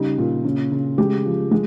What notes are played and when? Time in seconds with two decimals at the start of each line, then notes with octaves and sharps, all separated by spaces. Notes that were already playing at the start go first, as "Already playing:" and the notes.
Already playing: C#3 G3 D#4
0.18 A#2
0.44 C#3
0.72 C#3
0.98 G#3 G4
1.25 F3
1.51 G#3